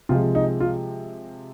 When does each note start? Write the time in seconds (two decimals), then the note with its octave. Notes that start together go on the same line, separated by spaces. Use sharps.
0.09 C3 F3 G#3 F4
0.35 D#4
0.60 F4